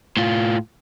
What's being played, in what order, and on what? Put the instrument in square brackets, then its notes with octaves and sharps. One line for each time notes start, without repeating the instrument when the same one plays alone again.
[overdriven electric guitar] A2 F4